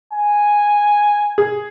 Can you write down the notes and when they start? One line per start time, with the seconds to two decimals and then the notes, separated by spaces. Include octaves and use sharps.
0.13 G#5
1.38 G#4